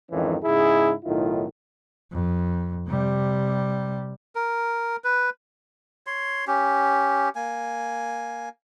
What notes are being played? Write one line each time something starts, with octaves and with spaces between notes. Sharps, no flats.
F2 G#2 D#3 E3 C#4
G#2 C#3 E4 G#4
B1 A2 D#3 E4 F4
F2
C3 G3
A#4
B4
C#5 C6
C#4 G4
A#3 G#5